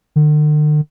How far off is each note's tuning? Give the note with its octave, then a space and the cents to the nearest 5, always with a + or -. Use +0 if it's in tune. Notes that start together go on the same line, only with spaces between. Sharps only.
D3 +45